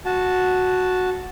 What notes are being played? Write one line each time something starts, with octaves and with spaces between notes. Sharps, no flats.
F#4 A5